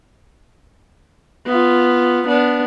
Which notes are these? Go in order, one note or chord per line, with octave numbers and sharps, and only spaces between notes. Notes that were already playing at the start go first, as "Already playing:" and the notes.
B3 F4
B3 D4